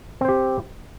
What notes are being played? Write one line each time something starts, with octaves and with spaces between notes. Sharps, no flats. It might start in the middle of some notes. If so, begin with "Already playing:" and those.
C4 G4 C5